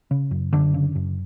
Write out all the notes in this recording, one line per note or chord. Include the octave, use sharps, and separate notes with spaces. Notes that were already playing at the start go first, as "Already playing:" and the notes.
C#3
F#2
F#2 D3 D4
C#3
F#2